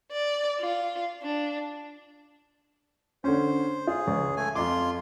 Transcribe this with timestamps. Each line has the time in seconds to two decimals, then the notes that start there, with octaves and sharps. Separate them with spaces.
0.12 D5
0.61 F4
1.23 D4
3.24 D3 C#4 C5
3.87 F4 G#4
4.07 C#2
4.37 A3 G#5
4.56 F2 F4 C6 D6